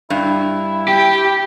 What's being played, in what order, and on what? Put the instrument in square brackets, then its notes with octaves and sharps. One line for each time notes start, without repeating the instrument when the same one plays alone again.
[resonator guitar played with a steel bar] G2 [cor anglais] E4
[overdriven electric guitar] G4 [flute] G5